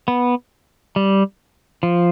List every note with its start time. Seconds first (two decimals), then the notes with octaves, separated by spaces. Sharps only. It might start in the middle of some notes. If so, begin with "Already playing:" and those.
0.08 B3
0.96 G3
1.83 F3